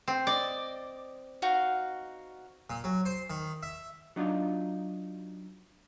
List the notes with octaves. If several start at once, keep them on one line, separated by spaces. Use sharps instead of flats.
C4
D5 D#5
D#4 F#4 F5
A#2
F#3
C5
D#3
E5
F#3 D4 D#4 F4